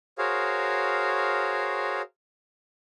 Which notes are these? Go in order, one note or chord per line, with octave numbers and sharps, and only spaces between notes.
F#4 G#4 A#4 C5 C#5 F5